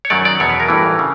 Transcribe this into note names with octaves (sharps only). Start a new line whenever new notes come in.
C#5
F#2 D#3 F#3 D5
D5
E2 B2 F#3 C#5
B4
A#4
A1 G2 E3
C#3